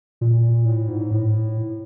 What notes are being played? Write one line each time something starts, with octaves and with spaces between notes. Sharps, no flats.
A#2
A2
G#2
A2